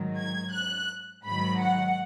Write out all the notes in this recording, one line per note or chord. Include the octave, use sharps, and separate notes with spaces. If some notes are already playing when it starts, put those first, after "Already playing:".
Already playing: G#2 D#3 F#3
G#6
F#6
G#2 D#3 F#3 B5
F#5